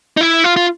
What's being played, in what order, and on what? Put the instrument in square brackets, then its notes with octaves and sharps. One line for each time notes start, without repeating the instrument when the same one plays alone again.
[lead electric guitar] D#4
E4
F4
F4